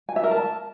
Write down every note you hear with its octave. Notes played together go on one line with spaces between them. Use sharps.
G#5
E5
A#4
A5